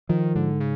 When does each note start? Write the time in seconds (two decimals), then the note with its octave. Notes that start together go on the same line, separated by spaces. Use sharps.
0.09 D#3 F3
0.35 G#2 D3
0.60 C#3